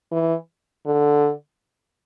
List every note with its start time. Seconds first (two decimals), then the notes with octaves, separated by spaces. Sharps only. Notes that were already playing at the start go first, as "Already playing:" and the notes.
0.12 E3
0.86 D3